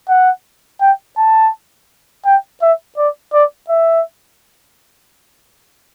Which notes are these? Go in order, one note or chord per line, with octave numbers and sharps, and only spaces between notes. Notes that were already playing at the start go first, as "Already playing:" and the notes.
F#5
G5
A5
G5
E5
D5
D5
E5